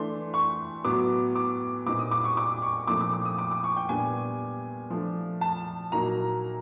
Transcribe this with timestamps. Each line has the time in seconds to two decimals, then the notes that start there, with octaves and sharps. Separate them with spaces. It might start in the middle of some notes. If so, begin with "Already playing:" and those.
Already playing: E3 A3 D4 C6
0.34 C#6
0.84 A2 F#3 B3 D6
1.35 D6
1.86 A#2 G3 C4 D#4 D6
1.99 D#6
2.11 D6
2.24 C#6
2.37 D6
2.62 C#6
2.87 A#2 F3 A3 C4 D#4 D6
3.01 D6
3.13 D6
3.25 D#6
3.38 D6
3.51 D6
3.64 C#6
3.77 G5
3.89 A#2 G3 B3 D4 G#5
4.90 F3 A3 D4
5.41 A5
5.92 A#2 F#3 A#3 D#4 A#5